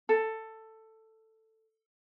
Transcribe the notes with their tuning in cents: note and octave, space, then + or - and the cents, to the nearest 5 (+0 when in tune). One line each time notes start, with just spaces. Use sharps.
A4 +10